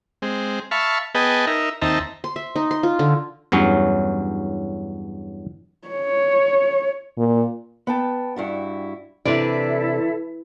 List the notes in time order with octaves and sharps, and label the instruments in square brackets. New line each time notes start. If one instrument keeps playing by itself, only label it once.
[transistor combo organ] G#3 C4
E5 F5 A5 B5 C#6
B3 G#4 B4 D#5 G5 A5
D#4 A#4 E5
D#2 C4 D#4 E5 A5 A#5
[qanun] C6
E5
D#4
C6
F4
D3
[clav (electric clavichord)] E2 G2 F#3 C#4
[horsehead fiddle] C#5
[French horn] A#2
[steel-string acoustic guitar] B3 G5 A5
G2 E4 F#4
[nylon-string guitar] C3 D4 D5 [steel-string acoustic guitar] E3 [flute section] E4 A4